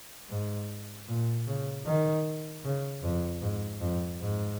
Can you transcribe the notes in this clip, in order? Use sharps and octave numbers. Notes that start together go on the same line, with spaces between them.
G#2
A#2
C#3
D#3
C#3
F2
G#2
F2
G#2